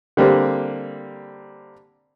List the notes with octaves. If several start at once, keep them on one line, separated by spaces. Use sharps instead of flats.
D3 G3 A#3 C4